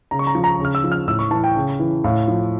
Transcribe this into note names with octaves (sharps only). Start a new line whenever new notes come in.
C#3 A#5
C#6
A#5
F3
A#5
C#3
F6
E6
F3
F6
A2 E6
C#6
E3 A5
G5
C#3
E3
A2 F5
F3